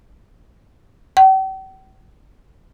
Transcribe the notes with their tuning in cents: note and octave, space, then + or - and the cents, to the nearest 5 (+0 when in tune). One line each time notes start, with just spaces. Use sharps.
G5 -45